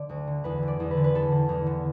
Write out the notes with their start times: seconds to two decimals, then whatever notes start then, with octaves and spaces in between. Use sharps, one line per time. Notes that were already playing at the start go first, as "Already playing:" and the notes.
Already playing: D3 D4 D5
0.09 D2
0.27 D3
0.44 E2 B4
0.63 D3
0.68 D5
0.80 E2
0.91 B4
0.97 D3
1.04 B4
1.15 E2 A4
1.32 D3
1.49 E2
1.67 D3